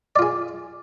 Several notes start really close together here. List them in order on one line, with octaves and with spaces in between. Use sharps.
D5 F4 G#4